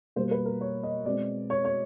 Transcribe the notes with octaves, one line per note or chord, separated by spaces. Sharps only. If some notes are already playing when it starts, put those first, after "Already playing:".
B2 G3 A#3 C5
B4
A#4
C#5
D#5
B2 G#3 C4 D5
C#5
C#5